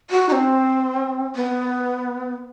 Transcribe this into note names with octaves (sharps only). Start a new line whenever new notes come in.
F#4
D#4
C4
B3